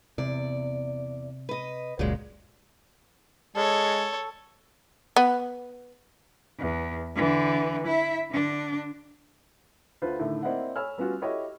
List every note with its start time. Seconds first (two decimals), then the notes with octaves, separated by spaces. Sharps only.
0.18 E2 C3 D5
1.49 B4 D#5
1.99 F#1 C#2 A#2 F#3 G#3
3.56 G#3 A4 C#5
5.16 B3
6.59 E2
7.15 D3 E3
7.87 E4 E5
8.31 D3 D4
10.02 D2 D3 F4 B4 C5
10.19 A2 D3 D#3 A3
10.43 A#3 C4 E4 D5 D#5 F#5
10.76 C#5 G#5 B5 E6 F6
10.98 G3 B3 C#4 F4 F#4
11.22 E4 F#4 G4 A4 C#5 D#5